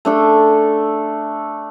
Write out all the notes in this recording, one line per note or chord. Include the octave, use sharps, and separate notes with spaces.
A3 D4 A4